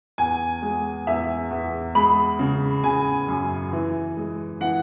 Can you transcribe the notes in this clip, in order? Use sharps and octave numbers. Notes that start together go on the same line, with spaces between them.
E2 G#5
G#3
E2 E5
E2
G#3 B5
C#3
C#3 G#5
F#2
E3
G#3
E3 F#5